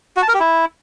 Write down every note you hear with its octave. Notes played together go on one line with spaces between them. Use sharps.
F#4
A5
A#4
G4
E4